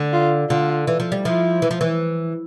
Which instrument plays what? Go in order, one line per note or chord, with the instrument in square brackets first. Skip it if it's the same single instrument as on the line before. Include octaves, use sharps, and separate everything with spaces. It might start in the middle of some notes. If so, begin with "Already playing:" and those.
Already playing: [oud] D3
[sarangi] F4
[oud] D3 [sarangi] F4
[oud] E3
F3
G3
[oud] F3 [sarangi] E4
[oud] E3
F3
E3